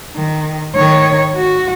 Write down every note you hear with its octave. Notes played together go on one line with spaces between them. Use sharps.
D#3
D#3 C#5
F#4